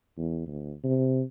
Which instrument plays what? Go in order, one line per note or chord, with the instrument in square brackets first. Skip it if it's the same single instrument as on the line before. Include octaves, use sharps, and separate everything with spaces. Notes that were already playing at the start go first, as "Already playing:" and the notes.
[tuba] E2
D2
C3